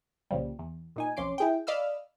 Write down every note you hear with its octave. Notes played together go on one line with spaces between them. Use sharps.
C2 A#2 C#3 F3 G3
E2
A#2 D#4 G#5
B1 F2 C#4 C6 D6
E4 G#4 G5
D5 D#5 F5 B5 E6 F6